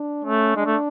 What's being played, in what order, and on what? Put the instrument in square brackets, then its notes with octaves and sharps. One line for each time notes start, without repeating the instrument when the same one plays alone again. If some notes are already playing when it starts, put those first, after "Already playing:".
Already playing: [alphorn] D4
[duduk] A3 [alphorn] C#4
[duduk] G#3 [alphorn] D4
[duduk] A3